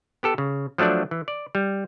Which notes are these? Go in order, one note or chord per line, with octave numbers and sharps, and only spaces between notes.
B3 G4 A4
C#3
F3 F#3 A3 D4 D5
E3
D5
G3